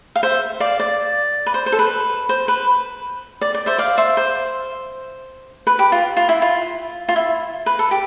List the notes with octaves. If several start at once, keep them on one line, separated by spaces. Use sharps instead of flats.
F5
C5 E5
D5 F5
D5
B4
C5
C5
A4
B4
C5
B4
D5
D5
C5 E5
D5 F5
C5 E5
C5
B4
G4
F4
F4
E4
F4
F4
E4
B4
A4
G4